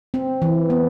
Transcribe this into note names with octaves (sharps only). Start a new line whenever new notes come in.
C4
E3
B3